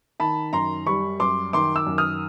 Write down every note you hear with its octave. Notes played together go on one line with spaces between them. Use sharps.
D#3 A5 B5
F#2 A#5 C6
G3 B5 C#6
F#2 C6 D6
D#3 C6 D6
D6 E6
F#2
D#6 F6